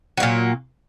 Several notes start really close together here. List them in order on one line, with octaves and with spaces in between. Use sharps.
F#3 A#3 A#2